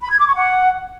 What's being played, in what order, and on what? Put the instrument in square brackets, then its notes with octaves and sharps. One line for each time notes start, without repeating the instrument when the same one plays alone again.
[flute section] B5
G#6
D6
C#6
F#5